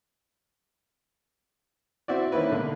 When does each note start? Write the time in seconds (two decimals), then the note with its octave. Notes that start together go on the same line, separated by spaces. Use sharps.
2.08 C4 E4 F#4 D5
2.32 D#3 A#3 C#4 E4 B4
2.51 B2 D3 A#3